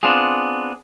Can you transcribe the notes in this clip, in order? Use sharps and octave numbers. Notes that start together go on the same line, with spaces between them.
B3 C4 D4 F4 G#4